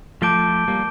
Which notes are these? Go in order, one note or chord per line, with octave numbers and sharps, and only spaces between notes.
F3 A3 A5 D6 G6 D7 G7
G3 A#3